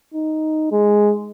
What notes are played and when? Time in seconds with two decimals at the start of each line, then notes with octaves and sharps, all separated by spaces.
0.14 D#4
0.72 G#3